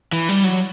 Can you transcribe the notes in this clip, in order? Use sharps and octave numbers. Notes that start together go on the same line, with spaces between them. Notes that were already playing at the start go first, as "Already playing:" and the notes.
E3
G3
F#3